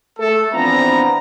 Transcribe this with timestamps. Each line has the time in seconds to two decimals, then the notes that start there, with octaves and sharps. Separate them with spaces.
0.19 A3 A4
0.53 E3 F3 B3 C4 D4 A#5